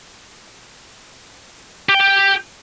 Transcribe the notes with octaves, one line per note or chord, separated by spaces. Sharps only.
G4
G5
G4